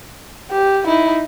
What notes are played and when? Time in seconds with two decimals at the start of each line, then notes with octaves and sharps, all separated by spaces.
0.51 G4
0.86 D#4 E4